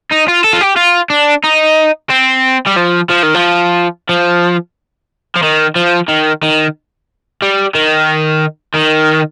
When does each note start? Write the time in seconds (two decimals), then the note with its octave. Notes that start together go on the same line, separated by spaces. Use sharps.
0.11 D#4
0.28 F4
0.44 A4
0.53 F4
0.61 G4
0.77 F4
1.10 D4
1.44 D#4
2.10 C4
2.67 G3
2.77 F3
3.10 F3
3.23 D#3
3.35 F3
4.09 F3
5.36 F3
5.43 D#3
5.76 F3
6.08 D#3
6.43 D#3
7.42 G3
7.75 D#3
8.75 D#3